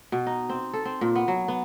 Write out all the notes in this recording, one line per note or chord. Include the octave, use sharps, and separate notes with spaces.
B2
D#4
C4
A4
C4
A#2
B3
F#3
B3